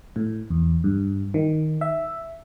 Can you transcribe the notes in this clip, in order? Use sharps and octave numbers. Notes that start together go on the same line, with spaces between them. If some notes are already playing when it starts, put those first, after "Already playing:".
A2
E2
G2
D#3
E5